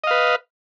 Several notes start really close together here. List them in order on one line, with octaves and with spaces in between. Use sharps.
D#5 F5 B4